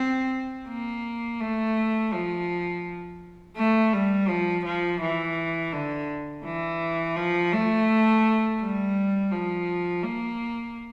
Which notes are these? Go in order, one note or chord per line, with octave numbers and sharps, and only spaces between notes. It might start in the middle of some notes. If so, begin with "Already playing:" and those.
Already playing: C4
A#3
A3
F3
A3
G3
F3
F3
E3
D3
E3
F3
A3
G3
F3
A#3